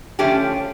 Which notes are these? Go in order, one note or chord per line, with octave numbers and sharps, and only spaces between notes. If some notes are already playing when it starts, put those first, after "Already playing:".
D3 F3 A3 C#4 G4